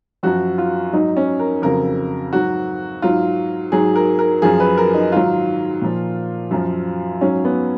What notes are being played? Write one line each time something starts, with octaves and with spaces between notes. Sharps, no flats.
F#2 F3 F#4
F4
G#2 F#3 D#4
C#4
A#4
F2 C#3 F#3 A#4
G#2 F#3 F#4
G#2 F#3 F4
G#2 F#3 G#4
A#4
A#4
F#2 F3 G#4
B4
A#4
D#4
G#2 D#3 F#3 F4
A#2 F3
F#2 F3
G#2 F#3 C#4
B3